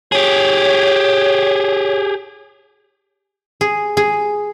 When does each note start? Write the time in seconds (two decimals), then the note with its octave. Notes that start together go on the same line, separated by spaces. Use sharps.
0.12 G4 G#4 C#5
3.61 G#4
3.97 G#4